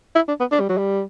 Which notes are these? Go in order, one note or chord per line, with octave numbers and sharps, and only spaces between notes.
E4
D4
B3
D4
G3
F#3
G3